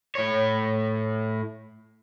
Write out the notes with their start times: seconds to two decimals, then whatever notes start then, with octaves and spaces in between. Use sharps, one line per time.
0.15 A2 C#5